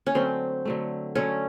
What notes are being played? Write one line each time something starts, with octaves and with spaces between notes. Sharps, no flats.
C#4
D3 F#3 A3 C4
D3 F#3 A3
D3 F#3 A3 C#4